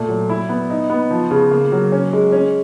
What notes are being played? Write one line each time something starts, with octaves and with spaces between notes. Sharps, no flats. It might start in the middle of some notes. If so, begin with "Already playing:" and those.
Already playing: A#2 A3
F#3
E4
B3
D#4
B3
F3
C#3
A#3
F#3
C#4
G#3
C#4